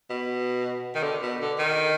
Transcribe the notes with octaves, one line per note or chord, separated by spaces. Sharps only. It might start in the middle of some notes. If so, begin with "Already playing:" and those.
B2
D#3
D3
B2
D3
D#3